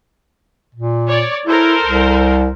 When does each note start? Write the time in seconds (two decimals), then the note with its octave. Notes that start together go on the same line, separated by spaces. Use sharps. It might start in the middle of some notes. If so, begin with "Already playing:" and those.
0.75 A#2
1.08 C#5 D5
1.47 E4 A4 A#4 C5
1.84 C2